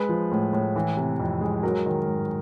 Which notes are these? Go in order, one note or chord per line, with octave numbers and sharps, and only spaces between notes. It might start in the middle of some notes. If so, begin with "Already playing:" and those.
Already playing: G#3 B4
F3
A2
A2
E3
C3
F2
G#3
F#3 A#4
D#3
G#2